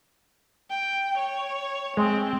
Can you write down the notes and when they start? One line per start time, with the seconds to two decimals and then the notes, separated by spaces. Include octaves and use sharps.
0.70 G5
1.18 C#5
1.97 G#3 C4